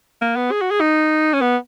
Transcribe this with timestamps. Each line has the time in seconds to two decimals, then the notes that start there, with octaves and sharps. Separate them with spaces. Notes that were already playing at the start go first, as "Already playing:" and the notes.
0.21 A#3
0.36 B3
0.51 G#4
0.61 F#4
0.71 G#4
0.81 D#4
1.34 C#4
1.41 B3